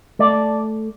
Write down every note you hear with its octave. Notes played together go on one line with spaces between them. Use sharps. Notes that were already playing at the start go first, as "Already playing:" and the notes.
A3 D5